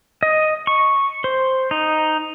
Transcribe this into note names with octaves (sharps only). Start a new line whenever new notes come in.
D#5
C#6
C5
D#4